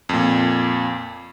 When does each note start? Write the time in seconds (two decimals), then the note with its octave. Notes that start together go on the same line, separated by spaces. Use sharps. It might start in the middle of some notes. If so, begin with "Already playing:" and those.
0.09 F2 A#2